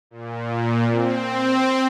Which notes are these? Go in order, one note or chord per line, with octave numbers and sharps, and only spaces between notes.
A#2
C4